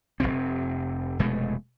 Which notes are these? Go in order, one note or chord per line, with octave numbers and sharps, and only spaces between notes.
F1 C#2 C3 C4
F1 B2 G#3 A3